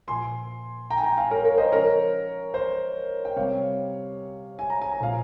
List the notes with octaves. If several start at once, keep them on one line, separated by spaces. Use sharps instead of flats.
A#2 F3 G#5 C6
G5 A#5
G#5
G5 A#5
F5 G#5
A#4 C#5
A#4 C#5
C5 D#5
C#3 F3 A#4 C#5
C5
G5
C3 G3 C#5 F5
G#5
A#5
G#5
A#5
A#2 F3 F5 G#5